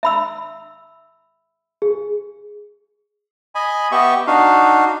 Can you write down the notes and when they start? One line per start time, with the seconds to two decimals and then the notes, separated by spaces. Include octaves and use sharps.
0.03 E5 B5 E6
1.82 G#4
3.55 D#5 G#5 B5
3.92 B3 G4 D#5 E5 C#6
4.27 D4 D#4 F#4 F5